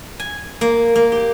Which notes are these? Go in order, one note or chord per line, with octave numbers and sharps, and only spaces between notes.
G#5
A#3
A#3
G4